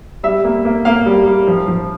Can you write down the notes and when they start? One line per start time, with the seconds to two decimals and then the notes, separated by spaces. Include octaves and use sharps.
0.23 G3 E5
0.44 A#3
0.65 A#3
0.85 A#3 F5
1.06 G3
1.26 G3
1.47 F3
1.68 F3